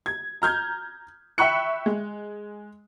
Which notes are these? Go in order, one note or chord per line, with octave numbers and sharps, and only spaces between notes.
G#6
A#5 F6 G6 G#6
E5 G5 B5 C#6 F#6 C#7
G#3